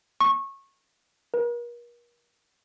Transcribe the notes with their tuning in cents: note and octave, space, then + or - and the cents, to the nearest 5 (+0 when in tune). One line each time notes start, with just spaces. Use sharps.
C#6 -20
A#4 +40